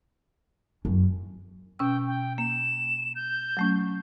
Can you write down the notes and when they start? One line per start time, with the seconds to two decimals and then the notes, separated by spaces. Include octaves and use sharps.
0.85 F#2
1.79 B2 C#4 G5 E6
2.07 G5
2.38 A#3 E7
3.15 G6
3.57 F#3 A3 C#4